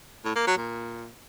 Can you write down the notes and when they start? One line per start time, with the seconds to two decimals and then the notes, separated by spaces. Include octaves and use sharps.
0.25 A2
0.36 A#3
0.46 F#3
0.57 A#2